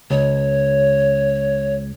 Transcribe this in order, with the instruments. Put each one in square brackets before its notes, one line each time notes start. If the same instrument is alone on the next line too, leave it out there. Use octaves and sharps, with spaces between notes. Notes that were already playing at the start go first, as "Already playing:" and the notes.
[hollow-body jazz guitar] C#2 [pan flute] C#5